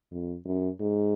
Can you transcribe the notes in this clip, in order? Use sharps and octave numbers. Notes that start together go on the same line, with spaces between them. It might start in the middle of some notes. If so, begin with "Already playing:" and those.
F2
F#2
G#2